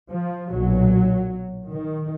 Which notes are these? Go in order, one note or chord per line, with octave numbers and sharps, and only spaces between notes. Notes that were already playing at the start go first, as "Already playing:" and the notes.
F3
B1 A#2 F#3
D#3